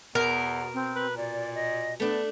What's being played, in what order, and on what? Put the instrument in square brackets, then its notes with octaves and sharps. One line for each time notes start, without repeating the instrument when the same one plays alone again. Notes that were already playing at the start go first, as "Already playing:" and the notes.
[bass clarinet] E2 [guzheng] B2 [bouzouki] A#4
[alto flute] C4
[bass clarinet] B4
[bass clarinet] A#2 [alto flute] D5
[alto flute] D#5
[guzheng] A3 D4 [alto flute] B3